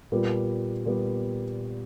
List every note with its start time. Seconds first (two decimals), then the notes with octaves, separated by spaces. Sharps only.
0.12 A#2 G3 B3
0.85 A#2 G3 B3